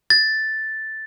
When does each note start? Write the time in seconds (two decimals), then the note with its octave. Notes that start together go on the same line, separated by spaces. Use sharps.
0.10 A6